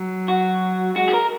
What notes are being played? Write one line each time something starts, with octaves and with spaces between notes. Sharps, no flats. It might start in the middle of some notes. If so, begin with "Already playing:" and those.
Already playing: F#3
F#4
G#3 F#4
G#4
A#4